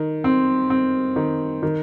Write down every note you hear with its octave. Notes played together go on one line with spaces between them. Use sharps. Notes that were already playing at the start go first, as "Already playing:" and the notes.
Already playing: D#3
C4
C4
D#3
D#3